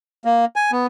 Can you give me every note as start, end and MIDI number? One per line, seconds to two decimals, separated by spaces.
0.25 0.45 58
0.56 0.71 80
0.72 0.87 59